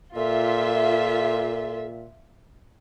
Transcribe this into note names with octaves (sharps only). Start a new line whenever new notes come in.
A#2 F4 A4 E5